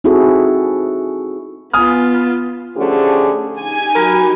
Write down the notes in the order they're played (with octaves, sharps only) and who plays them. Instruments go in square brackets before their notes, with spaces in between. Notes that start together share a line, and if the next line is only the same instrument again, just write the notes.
[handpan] C4 D#4 E4 F#4 G#4 A4
[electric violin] B3 F4 [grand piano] G#5 D#6 F6
[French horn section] D3 F3 A3 C#4 G4 G#4
[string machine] D#4 G4 [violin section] G#5
[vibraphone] F#3 F#4 B5 [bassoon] A#4